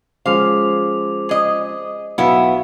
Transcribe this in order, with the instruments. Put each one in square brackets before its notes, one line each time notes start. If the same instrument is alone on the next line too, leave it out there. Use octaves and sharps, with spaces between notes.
[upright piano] F3 G#3 C#4 [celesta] C5 D6 F7 [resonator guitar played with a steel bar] F5
[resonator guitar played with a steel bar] G#4 D#5
[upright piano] B1 [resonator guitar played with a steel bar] B3 E4 E5 [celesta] F5